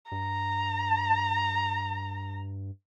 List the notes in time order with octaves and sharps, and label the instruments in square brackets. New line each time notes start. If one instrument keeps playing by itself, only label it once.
[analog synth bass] G2 [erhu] A#5